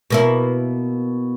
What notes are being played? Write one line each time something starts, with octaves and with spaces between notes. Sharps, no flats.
B2 A#3 E4